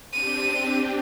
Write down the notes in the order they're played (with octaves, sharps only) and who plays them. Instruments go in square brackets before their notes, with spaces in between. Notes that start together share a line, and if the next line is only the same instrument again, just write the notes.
[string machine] C4 D4 G4 [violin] D#7